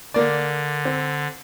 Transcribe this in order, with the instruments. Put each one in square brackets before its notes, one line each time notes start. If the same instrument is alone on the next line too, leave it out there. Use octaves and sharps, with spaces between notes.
[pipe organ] D3 [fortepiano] A#3 D5
[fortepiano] C4